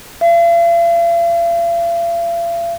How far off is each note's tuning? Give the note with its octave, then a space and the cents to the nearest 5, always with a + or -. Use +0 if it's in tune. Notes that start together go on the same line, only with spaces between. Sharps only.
F5 -45